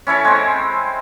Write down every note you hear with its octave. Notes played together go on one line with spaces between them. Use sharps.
C#4 E4 A4 C#5
G#3 C4